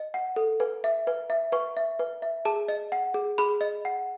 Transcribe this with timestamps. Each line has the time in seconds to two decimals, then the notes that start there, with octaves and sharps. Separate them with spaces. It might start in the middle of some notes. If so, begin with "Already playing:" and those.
Already playing: D#5
0.14 F#5
0.36 A4
0.60 B4
0.84 E5
1.07 B4
1.30 E5
1.52 B4 C#6
1.77 E5
1.99 B4
2.22 E5
2.45 G#4 A5
2.68 D#5
2.92 F#5
3.14 G#4
3.38 G#4 B5
3.61 D#5
3.85 F#5